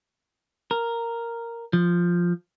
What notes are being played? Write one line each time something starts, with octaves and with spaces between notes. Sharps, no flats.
A#4
F3